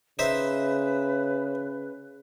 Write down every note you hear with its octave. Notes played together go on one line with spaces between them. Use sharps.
C#3 D#4 B4 C5 E5